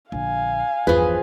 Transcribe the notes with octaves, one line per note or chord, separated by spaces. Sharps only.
A#1 D3 F5 G#5
G1 E2 F3 G#4 B4